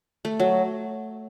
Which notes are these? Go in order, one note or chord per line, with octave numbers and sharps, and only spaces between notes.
A3
F#3